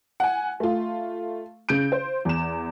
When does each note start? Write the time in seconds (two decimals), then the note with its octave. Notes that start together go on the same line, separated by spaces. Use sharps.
0.20 F#5 G#5
0.60 A3 F4
1.69 C#3 G6 D7
1.92 C5
2.25 E2 E7